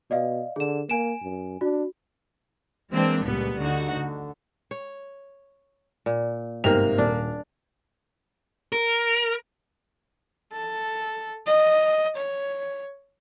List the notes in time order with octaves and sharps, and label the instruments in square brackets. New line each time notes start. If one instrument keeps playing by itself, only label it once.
[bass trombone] B2 [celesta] D5 D#5 F5
[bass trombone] D3 [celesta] G#4 E7
[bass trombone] A#3 [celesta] G#5 D7 E7
[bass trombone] F#2
[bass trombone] D4 [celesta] F#4
[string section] E3 G#3 A#3 C4 D4
C#2 A#2 G3 B3
D2 D3 D#4 F#4
D3
[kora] C#5
A#2
[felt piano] G1 G#2 [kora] C3 [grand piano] A#3 F7
[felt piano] D#1 [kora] D4
[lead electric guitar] A#4
[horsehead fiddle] A4
D#5
C#5